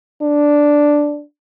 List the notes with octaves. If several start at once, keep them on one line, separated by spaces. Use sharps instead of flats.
D4